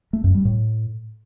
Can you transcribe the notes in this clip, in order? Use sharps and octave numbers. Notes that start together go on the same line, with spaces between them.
A3
F#2
G3
A2